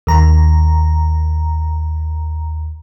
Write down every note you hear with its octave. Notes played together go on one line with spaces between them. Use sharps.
D#2 A#5